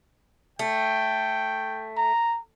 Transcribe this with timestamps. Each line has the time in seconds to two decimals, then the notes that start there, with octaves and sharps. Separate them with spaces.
0.59 A3 G5
1.96 A#5